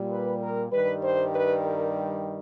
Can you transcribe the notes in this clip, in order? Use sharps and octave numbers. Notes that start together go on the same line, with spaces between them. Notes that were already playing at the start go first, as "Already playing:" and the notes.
Already playing: A#2 G3
B4
A#4
G2 D#3 G3 B4
C5
B4
A#4